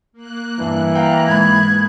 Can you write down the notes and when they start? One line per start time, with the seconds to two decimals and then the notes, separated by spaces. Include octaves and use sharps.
0.13 A#3 F#6
0.59 G2 E3
0.95 F5 G5 A#5
1.27 G#2 B5 G#6